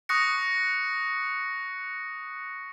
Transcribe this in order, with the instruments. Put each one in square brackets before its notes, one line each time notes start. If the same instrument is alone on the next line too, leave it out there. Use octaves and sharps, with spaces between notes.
[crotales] C#6 D#6 F#6 A#6 C#7